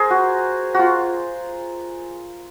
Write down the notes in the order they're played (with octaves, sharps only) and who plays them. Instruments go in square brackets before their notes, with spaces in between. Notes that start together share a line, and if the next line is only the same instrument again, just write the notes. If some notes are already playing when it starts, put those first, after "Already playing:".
Already playing: [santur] G#4 A#4 C5
F#4
F4 F#4